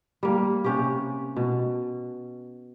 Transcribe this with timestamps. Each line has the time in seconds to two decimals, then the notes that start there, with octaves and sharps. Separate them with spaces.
0.23 G3 A#3
0.64 C3 C#4 G4
1.37 B2